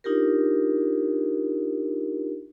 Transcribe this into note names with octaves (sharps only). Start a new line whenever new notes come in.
D4 D#4 F4 G4 A#4